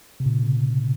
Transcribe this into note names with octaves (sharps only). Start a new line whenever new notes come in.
C3
A#2 C#3
C3